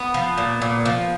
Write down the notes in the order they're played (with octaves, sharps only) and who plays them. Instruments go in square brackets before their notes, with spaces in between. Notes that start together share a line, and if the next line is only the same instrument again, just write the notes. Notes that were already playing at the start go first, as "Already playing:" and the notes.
Already playing: [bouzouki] B3
F3
A#2
A#2
F3